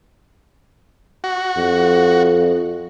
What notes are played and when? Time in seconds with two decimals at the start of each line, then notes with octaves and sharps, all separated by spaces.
1.24 F#4
1.57 F2